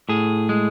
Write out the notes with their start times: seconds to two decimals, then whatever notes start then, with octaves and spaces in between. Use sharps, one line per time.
0.09 A2 G#4
0.49 G#3